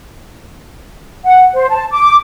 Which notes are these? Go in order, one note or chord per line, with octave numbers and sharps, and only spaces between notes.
F#5
C5
A5
D6